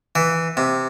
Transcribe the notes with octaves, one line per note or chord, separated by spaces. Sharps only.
E3
C3